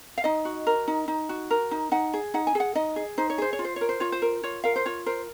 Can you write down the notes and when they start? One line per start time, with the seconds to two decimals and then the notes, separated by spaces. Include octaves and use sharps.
0.18 F5
0.24 D#4 D#5
0.45 F#4
0.67 A#4
0.88 D#4
1.08 D#4
1.29 F#4
1.51 A#4
1.71 D#4
1.92 D#4 F#5
2.14 G#4
2.34 D#4 F#5
2.47 G#5
2.55 G#4 F#5
2.75 D#4 D#5
2.96 G#4
3.18 D#4 C5
3.30 C#5
3.38 G#4 C5
3.53 C#5
3.59 F4
3.65 C5
3.76 A#4 C#5
3.89 C5
4.00 F4 C#5
4.12 C5
4.22 A#4
4.44 F4 C#5
4.64 A#4 F5
4.76 C5
4.86 F4 C#5
5.06 A#4 C5